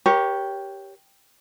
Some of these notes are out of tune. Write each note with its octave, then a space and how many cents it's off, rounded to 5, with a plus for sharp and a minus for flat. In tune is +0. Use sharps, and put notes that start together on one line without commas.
G4 +0 A#4 +35 C#5 +0